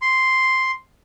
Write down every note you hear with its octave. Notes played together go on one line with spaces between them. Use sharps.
C6